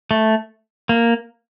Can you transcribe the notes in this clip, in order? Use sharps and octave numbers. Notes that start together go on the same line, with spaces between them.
A3
A#3